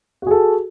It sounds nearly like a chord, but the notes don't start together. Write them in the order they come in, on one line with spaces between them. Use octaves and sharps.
F#4 G#4 A4